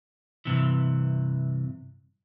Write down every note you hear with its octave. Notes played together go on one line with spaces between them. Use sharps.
G2 C3 E3